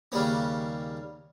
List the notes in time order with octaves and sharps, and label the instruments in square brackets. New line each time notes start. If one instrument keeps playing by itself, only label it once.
[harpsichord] D#2 C#3 G3 A#3 C#4